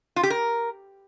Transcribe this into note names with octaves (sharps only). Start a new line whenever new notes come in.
F4
G4
A#4